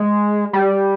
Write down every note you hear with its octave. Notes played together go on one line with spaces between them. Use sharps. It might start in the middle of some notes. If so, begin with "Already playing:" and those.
Already playing: G#3
G3